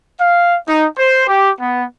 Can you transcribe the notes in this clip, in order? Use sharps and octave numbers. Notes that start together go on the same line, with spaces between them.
F5
D#4
C5
G4
B3